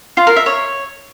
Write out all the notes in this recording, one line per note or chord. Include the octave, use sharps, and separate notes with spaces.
F4
A#4
E5
C#5